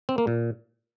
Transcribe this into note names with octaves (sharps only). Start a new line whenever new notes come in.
C4
A#3
A#2